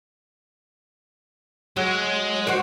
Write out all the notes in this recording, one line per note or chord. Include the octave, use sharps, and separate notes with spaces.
F#3 G#3
F#4 C5 D5